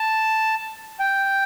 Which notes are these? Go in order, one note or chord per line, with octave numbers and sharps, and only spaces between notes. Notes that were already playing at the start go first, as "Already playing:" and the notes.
Already playing: A5
G5